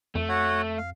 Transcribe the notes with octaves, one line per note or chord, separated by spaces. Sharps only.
F2 A3
F#4 C#5 F#5
F5